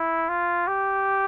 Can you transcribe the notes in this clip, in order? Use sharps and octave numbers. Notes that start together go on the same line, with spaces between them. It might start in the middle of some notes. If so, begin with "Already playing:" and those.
Already playing: E4
F4
G4